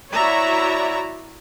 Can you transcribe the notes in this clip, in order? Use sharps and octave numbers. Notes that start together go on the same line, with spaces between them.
E4 F#4 C#5 D5 E5 A#5